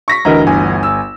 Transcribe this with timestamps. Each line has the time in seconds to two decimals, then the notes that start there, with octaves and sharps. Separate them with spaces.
0.08 C#6 A#6 B6
0.25 D2 G2 E3 A#4 D#5 A#5
0.47 G1 G#5
0.83 E6